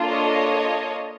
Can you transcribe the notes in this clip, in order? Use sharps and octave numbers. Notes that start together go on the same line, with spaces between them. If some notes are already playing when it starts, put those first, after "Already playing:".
Already playing: A#3 D4 F4 A4
C#5 D#5